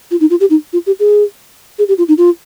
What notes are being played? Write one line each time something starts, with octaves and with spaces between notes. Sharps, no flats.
F4
D#4
F4
G4
D#4
F4
G4
G#4
G#4
G4
F4
D#4
F4